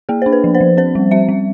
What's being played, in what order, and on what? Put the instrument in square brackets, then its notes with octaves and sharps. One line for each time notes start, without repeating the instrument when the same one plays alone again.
[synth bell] A#3 G#4
D4 C5
B4
F3
C5
F3
C4 C5
G3
C4 E5
G3